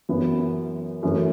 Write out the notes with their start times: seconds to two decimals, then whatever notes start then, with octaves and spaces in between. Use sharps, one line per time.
0.09 F#2 E3 B3 E4 B4
1.03 F#2 E3 A3